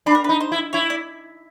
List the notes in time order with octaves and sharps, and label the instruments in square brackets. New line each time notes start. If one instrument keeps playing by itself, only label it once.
[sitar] D4 [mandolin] B4
[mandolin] A#4
B4
[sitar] D#4
[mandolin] C5
[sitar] E4
[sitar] E4 [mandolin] C#5
[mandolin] D5